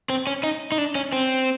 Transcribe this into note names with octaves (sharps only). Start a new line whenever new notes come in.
C4
C#4
D#4
D#4
D4
C#4
C4